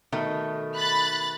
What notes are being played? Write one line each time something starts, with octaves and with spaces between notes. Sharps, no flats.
B2 D#3 A3
B5 F#6 A6